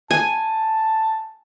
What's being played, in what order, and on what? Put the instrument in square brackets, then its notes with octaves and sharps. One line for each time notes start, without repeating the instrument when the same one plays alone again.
[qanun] G#5 [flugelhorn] A5